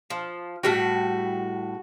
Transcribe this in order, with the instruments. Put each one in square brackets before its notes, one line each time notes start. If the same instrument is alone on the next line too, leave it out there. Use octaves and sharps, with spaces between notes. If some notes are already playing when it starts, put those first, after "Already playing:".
[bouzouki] F3
[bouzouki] A2 G3 G5 [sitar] F#4